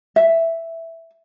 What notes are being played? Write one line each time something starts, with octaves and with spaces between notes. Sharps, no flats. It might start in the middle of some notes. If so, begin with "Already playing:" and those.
E5